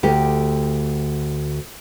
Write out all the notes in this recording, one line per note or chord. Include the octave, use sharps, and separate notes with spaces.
D2 G4